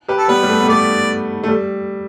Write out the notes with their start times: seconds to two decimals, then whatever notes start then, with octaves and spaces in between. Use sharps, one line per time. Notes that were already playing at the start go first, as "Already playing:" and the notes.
0.08 G4 B4
0.17 A4
0.28 G3 B3 B4
0.43 G3
0.49 A3
0.61 B3
0.68 A3 D5
1.44 A3
1.48 G3